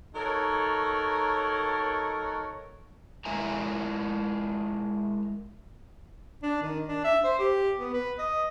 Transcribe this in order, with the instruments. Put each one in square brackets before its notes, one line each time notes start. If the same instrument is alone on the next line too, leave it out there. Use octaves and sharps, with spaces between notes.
[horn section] F#3 D#4 A4 A#4 C#5
[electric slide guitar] G#3 E4 A#4 E5 G#5 A#5
[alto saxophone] D4
D#3
D4
E5
C5
G4
B3
B4
D#5